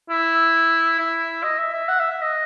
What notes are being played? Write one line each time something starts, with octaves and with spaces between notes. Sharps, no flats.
E4
E4
D#5
E5
E5
F#5
E5
E5
D#5